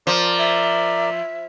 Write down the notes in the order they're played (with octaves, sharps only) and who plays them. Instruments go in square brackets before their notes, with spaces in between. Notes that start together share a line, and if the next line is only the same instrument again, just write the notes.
[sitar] F3 [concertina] A#4 D5
[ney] E5